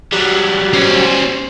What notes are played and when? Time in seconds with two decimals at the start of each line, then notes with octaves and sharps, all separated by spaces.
0.13 F#3 G3
0.73 C#4 C5